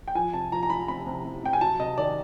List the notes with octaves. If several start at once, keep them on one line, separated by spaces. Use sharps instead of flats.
G5
F3 G#5
C3 A5
F3 A#5
A#5
F3 B5
C3 B5
C3
C3
C3 G5
G#5
F#3 A5
C3 D#5
D#3 D5